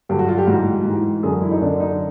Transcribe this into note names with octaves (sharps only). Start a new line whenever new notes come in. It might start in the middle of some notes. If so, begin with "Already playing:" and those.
G2 D3 F#3 G4
F#4
F4
G4
G#2 E3 F#4
G#2 E3
F#2 D3 F#3 G#4
E4
D#4
F#2 D3 F#3 D4
D#4